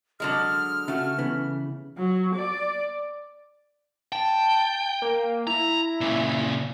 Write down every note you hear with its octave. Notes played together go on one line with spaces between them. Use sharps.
D3 F#3 G#3 F6
C#3 A3 F#4
C#3 E3 B3
F#3
D5
G5 A5
A#3
E4 A#5
A#2 C#3